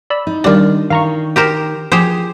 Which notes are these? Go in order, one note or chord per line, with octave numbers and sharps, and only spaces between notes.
D5 B5 E6
D#4
D#3 G3 D4 F4 G4
D#3 F5 A#5 C#6
G4 A#4 C5
F3 G4 G#4 C5